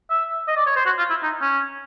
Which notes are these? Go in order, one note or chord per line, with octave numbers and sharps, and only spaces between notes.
E5
D#5
D5
C#5
C5
F#4
F4
E4
D#4
C#4